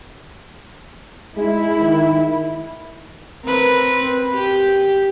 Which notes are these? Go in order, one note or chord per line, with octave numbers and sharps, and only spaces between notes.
G#3 E4
D#3
C4 A#4 B4
G4